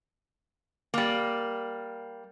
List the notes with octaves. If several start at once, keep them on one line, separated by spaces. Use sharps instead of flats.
G3 A#3